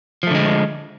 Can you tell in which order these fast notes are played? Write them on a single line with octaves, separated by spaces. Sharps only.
F3 A3 D3 G#3